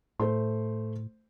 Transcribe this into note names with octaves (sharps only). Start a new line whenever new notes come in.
A2 A3 C5 C6